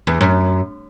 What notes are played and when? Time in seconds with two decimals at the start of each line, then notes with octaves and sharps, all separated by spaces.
0.07 E2
0.21 F#2